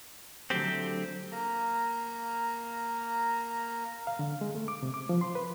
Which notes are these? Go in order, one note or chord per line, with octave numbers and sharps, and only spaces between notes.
D3 F#3 A3 C4 G4
A#3 A#5
F5
D3
G#3
A3
D6
C3
D6
F3
C6
B4